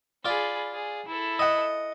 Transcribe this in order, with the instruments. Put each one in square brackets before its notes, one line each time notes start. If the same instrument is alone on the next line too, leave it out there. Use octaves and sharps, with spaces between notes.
[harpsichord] F4 D5 [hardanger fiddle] G#4 B5
[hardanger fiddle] G#4
E4 A4
[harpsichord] D#5 F#5